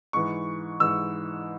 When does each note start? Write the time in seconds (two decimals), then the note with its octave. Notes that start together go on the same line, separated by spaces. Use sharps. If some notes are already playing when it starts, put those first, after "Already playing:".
0.13 G#2 E3 C#6
0.80 G#2 E3 E6